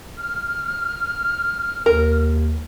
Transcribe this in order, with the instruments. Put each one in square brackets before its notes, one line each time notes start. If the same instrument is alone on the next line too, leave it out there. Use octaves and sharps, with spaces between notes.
[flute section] F6
[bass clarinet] D#2 [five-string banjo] A#4